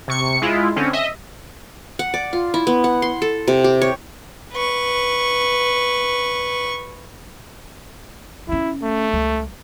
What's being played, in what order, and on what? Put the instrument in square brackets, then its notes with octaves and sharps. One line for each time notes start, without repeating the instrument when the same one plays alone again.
[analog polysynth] C3 C#6 C#7
G#3 E4 F4
D3 C4 C#4
D#5 E5
[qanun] F#5
D5
F4
E4
B3
F#5
C6
A4
C3
G4
C#5
[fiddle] B4 C#6
[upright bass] B3 C#4 [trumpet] E4
[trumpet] A3
[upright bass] C#2 G3